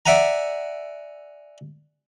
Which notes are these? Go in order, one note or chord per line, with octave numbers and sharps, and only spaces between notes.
D5 E5 F#5 G#5 A#5